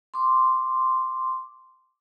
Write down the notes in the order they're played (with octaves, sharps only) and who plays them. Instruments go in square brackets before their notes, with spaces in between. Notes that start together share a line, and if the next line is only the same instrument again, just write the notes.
[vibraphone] C6 D6